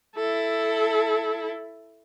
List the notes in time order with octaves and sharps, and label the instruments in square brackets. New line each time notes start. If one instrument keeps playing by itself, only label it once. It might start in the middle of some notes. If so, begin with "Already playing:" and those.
[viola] E4 A4